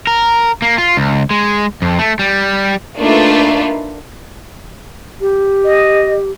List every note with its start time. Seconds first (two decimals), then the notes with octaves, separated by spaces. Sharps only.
0.07 A#4
0.62 A#3
0.78 F4
0.97 C#2
1.31 G#3
1.82 F2
1.99 A3
2.19 G3
2.97 A3 A#3 D4 D#4 F4 B4
5.21 G4
5.65 D#5